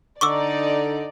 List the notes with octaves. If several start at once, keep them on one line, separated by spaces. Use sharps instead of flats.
D3 D#4 D5 C#6 D6 E6